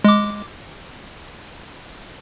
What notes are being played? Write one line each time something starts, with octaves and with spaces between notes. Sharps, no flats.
G#3 D6